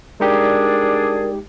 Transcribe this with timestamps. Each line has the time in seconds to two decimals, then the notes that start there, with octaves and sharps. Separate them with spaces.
0.20 G#3 D4 D#4 G4 G#4 A#4 D5